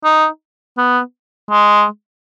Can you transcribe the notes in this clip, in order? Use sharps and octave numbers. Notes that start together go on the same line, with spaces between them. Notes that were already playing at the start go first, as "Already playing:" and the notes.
D#4
B3
G#3